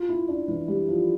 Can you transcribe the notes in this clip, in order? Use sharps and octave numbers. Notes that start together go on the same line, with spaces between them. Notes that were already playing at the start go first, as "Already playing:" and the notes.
Already playing: F4
E4
D4
E3
G3
F3